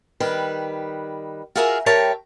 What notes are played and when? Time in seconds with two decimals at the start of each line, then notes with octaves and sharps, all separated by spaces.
0.20 D#3 G3 B4
1.55 F4 F#4 G#4 A#4 E5
1.86 G3 A#4 C#5 E5 G5 A5